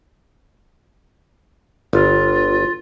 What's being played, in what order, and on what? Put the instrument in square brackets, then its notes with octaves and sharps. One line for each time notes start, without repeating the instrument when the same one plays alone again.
[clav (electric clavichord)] G1 [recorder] F4